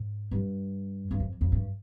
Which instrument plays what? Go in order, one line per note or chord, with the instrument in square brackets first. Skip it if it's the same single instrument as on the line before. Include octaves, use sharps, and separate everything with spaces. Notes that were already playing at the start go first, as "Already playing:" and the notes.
Already playing: [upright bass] G#2
G2
G2
F2
F2
G2